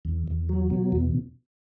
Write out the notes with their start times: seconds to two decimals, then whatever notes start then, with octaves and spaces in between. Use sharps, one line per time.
0.05 E2
0.28 E2
0.49 F#3
0.70 B2
0.92 E2